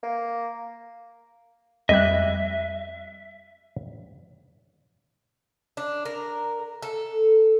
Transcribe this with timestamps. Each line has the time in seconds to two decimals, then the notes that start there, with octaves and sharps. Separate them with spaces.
0.03 A#3
1.89 F2 G3 D#5 E5 F#6
5.77 D4
6.06 A#4
6.82 A4